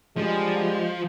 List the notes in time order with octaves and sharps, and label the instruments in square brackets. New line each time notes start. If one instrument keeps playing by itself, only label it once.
[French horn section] D3 G3 G#3 [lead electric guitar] F3